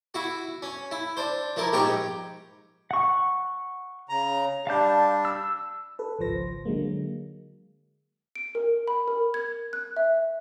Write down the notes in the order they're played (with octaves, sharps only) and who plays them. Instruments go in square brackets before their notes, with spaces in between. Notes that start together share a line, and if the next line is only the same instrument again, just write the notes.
[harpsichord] E4 F#4
C#4
E4
D4 C5
F3 A#3 E4 A#4
A#1 G#2 G4 C#5 G5 A#5
[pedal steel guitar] F#5 C#6
[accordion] C#3 A#5
[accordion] G3 D4 [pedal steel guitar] F5 A5 G6
[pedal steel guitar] E6
[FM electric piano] A4 B4
G#1 C#2 F3 C5 A#6
D3 F#3 G#3 A#3
[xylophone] D7
A#4
B5
A#4
G#6
F#6
E5